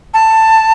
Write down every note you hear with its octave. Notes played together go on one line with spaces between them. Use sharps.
A5